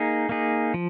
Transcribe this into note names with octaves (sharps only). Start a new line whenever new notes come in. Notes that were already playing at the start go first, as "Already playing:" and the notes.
Already playing: A#3 D#4 G#4
A#3 D#4 G#4
F3